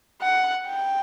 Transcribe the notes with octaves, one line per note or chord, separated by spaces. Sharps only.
F#5
G5